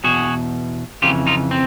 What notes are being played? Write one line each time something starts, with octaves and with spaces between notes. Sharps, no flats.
E2 B2 F#4 G#4
F2 C#3 E3 F4 G4
D#4 F4
C4